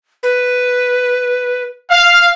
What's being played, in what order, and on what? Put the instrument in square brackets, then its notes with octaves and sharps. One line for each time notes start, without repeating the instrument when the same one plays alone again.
[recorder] B4
[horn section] F5